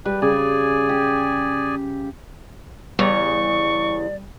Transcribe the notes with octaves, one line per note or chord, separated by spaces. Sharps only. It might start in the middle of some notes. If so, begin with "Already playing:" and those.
G3 B4
C#3 G#4 D5 G#5
G4
E2 C#3 G3 D5 C#6